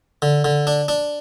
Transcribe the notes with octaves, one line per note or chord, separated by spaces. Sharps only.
D3
D3
D4
D4